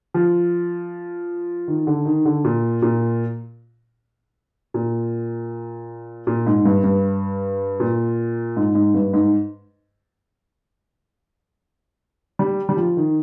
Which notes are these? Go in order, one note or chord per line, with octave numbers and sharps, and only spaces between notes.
F3
D#3
D3
D#3
D3
A#2
A#2
A#2
A#2
G#2
G2
G2
A#2
G#2
G#2
G2
G#2
G3
G3
F3
D#3